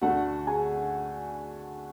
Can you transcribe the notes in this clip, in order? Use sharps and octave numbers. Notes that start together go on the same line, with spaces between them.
D2 D3 A3 D4 F#4 F#5
G#4 G#5